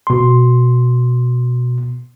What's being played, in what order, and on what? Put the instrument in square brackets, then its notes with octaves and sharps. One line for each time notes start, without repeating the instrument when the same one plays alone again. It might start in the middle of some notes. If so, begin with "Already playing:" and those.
[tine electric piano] B2 C6